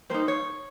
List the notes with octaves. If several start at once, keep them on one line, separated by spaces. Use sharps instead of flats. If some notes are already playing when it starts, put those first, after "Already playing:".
G3 A#3 D#4 C5
C#5